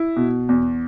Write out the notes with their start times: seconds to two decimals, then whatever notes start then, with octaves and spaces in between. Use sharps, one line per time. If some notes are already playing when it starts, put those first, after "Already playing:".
Already playing: E4
0.16 B2
0.49 E2